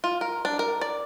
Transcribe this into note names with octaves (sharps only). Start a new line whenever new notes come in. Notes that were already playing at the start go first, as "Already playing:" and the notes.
F4
A#4
D4
A#4
D5